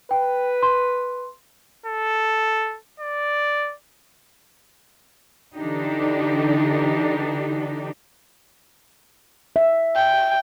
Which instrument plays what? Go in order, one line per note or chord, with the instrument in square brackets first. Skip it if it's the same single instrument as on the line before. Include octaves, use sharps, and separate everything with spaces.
[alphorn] B4 [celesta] G5
[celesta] C6
[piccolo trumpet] A4
D5
[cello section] D3 E3 D4 D#4 G4
[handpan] E5
[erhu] G5